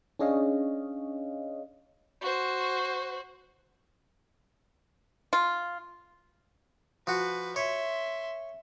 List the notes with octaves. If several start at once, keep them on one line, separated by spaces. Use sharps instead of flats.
C#4 D4 G#4 C#5 D#5 F5
F#4 C5
F4
F3 F#4 B4
C#5 E5 C6